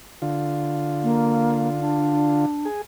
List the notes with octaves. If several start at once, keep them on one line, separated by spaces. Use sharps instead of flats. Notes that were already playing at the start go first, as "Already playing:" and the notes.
D3 F4
A#3
D4
G#4